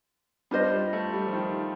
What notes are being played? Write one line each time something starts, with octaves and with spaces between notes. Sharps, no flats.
G3 D4 F4 C5 D#5
G3
A3
G3
F3
D#3